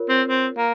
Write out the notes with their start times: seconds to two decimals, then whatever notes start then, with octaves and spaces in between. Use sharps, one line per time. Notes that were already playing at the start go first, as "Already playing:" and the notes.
Already playing: F4 A#4 C#5
0.09 C4
0.28 C4
0.57 A#3